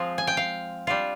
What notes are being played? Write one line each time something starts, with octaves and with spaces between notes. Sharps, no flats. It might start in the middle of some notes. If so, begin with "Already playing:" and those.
Already playing: F3 G#3 C4 F4
G#5
G5
F5
G3 D4 F4